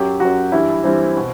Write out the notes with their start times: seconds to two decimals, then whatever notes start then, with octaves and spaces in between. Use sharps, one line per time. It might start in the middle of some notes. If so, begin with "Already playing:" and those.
Already playing: F#2 F#3 G4
0.20 F#2 F#3 F#4
0.52 G2 E3 G3 E4
0.84 G2 E3 G3 C4
1.17 B2